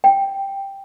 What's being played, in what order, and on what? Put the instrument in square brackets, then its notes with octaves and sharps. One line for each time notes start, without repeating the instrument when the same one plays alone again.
[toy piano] G5